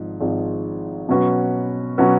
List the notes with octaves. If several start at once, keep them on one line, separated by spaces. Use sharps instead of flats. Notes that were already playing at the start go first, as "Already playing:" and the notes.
Already playing: G#1 G#2 F3 G#3
G#1 G#2 F3 G#3
B2 F#3 C#4 F#4 B4
B2 F#3 C#4 F#4 B4